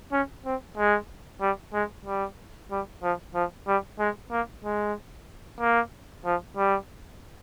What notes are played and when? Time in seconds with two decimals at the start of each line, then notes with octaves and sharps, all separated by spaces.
0.12 C#4
0.45 C4
0.77 G#3
1.41 G3
1.74 G#3
2.05 G3
2.71 G3
3.03 F3
3.34 F3
3.67 G3
3.99 G#3
4.31 A#3
4.64 G#3
5.60 A#3
6.25 F3
6.57 G3